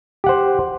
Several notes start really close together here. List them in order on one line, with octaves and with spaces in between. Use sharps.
G4 F#5 C5